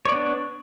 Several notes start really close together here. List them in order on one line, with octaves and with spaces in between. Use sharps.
C#5 D5 B3 D4